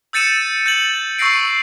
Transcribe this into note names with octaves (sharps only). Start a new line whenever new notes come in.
E6 G6 A6 C#7 D#7 E7
G6 A6 F#7
C#6 E6 G6 A#6 C7 D7